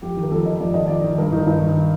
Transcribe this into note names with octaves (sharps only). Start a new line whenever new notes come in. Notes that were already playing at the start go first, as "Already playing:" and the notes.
F2 G4
D#3
A#4
F2 A4
D#3 D#5
F2 D5
D#3 D#5
F2 D5
D#3
G2 A#4
D#3 D#4
G2 D#4
D#3